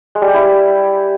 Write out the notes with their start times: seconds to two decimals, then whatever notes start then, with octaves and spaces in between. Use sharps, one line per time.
0.15 G#3
0.21 G3
0.28 G4
0.34 E4